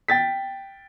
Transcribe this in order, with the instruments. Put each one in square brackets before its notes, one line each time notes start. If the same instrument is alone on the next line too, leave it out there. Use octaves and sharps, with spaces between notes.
[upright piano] G5 A6 B6